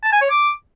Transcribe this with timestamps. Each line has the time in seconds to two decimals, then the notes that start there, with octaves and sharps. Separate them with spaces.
0.03 A5
0.12 G#5
0.21 C#5
0.30 D6